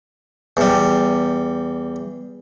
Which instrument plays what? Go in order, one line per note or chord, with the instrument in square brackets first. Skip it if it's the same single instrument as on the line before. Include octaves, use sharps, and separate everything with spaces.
[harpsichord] E2 G3